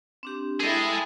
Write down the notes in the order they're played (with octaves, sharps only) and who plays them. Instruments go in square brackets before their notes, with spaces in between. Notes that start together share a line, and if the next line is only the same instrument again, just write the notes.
[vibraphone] C4 D4 G4
[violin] E4 A4 [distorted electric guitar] G#4 D#5 [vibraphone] G5 A5